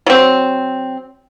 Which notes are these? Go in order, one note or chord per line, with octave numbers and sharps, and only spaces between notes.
F#3 C4